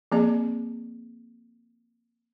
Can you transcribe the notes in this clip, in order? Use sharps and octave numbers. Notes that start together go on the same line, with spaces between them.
F3 A#3 C4 G#4 D5